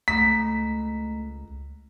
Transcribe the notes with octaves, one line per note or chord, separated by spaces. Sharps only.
C#2 A3 A#5 B6